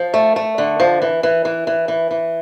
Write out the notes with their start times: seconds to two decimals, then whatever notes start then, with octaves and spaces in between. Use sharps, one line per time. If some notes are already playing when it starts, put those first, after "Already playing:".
Already playing: F3
0.14 A3
0.36 A3
0.58 D3
0.80 F3
1.02 E3
1.23 E3
1.45 E3
1.67 E3
1.88 E3
2.11 E3